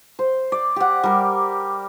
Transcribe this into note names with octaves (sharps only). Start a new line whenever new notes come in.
C5
D5
G4 F#5
G3 A#4